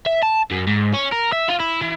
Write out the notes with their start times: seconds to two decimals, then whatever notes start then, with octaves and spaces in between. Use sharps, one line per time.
0.06 E5
0.22 A5
0.51 F#2
0.67 G#2
0.94 C#4
1.12 A#4
1.32 E5
1.48 F4
1.60 E4
1.81 E3